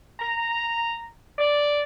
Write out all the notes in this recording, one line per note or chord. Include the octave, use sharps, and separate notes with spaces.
A#5
D5